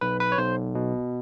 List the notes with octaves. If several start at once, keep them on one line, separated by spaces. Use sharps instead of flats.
B1 B4
B4
C#5
B1 C5
B2